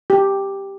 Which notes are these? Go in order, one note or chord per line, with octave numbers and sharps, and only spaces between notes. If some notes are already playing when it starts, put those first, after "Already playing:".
G4